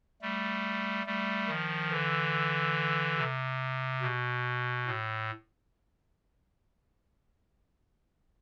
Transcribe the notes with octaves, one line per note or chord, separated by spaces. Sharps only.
G3 A3
G3 A3
D#3 F3
D3 E3
C3
B2
A2